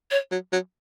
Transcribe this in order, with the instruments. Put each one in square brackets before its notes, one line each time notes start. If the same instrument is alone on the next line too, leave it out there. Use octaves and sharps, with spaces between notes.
[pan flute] C#5
[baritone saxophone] F#3
F#3